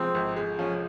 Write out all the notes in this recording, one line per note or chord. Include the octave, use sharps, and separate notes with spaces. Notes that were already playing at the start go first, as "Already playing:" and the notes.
Already playing: F3 G#3 C4
G#1
G#3
F3 C#4